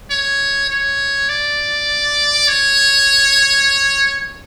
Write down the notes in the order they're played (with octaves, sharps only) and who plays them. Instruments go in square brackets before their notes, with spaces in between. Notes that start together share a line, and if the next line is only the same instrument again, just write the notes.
[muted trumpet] C#5
C#5
D5
C#5